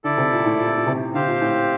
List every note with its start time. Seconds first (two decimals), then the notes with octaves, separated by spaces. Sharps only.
0.04 D3 E4 A4 D5
0.18 C3
0.32 A#2
0.46 A2
0.60 A#2
0.78 A#2
0.86 C3
1.14 D3 C4 G4 C5 F5
1.28 A#2
1.41 A2